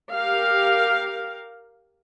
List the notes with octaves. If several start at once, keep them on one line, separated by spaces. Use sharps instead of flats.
G4 A#4 F5